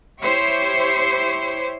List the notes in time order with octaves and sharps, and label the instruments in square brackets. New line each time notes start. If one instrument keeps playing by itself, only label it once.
[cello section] E4 G4 C5 C#5